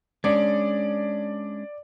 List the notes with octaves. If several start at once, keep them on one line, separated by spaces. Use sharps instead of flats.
G#3 C#4 D4 D5